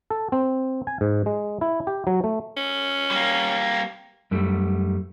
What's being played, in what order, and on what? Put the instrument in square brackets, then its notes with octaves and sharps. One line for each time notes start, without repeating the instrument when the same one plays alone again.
[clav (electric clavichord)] A4
C4
G#5
G#2
G#3
E4
G4
F#3
A3
[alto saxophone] C#4
[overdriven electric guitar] G3 A#3
[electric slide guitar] F#2 G3 A3